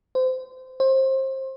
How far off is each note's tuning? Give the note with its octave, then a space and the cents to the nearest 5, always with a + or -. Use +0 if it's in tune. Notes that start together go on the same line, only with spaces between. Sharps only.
C5 -25
C5 +25